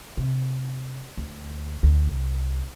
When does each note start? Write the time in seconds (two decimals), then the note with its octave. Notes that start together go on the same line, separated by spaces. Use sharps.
0.17 C3
1.17 D2
1.83 D2
2.07 C2